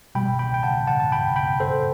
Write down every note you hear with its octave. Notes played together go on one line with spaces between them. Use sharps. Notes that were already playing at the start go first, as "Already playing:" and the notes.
B2 G3 G5 B5
G5 B5
G5
F#5 A5
F#5 A5
A5
G5 B5
G5 B5
A4 C5